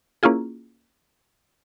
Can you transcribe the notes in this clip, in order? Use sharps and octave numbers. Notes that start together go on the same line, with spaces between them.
A#3 C#4 E4 F4 G#4